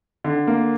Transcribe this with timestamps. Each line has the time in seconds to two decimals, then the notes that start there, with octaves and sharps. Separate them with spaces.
0.24 D3
0.47 A#3